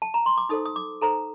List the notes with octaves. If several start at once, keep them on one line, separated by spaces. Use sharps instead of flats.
A5
A#5
C6
D6
D#4 A4 C5 D#6
D#6
D6
D#4 A4 C5 A#5